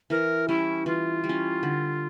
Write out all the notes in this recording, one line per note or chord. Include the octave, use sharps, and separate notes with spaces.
E3 A#4
G3 C#4 E4
E3 F4
G3
C#4
D3